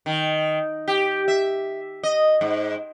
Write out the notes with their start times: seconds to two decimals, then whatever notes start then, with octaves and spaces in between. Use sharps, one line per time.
0.06 D#3
0.88 G4
1.28 E5
2.03 D#5
2.41 G#2